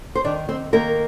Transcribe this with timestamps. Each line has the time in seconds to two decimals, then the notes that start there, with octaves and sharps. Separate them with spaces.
0.15 C5
0.24 D#3 D4 D5
0.49 D#3 C4 C5
0.73 D#3 A#3 A#4